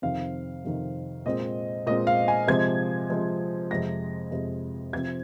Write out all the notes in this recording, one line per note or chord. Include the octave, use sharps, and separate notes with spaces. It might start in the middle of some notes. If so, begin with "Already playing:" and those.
F2 C3 D#3 C4 F5
F2 C3 D#3 C4
A#2 G#3 C4 D#5
A#2 G#3 C4 D#5
F5
G#5
C3 F3 G#3 C4 G#6
C3 F3 G#3 C4
F2 C3 G#3 A#6
F2 C3 G#3
C3 F3 C4 G#6